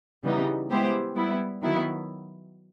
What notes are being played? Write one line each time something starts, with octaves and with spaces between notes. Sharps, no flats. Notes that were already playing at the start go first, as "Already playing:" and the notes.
C#3 E3 G3 B3 D#4
G#3 B3 E4 G4 C5
G3 B3 E4
D#3 F#3 B3 E4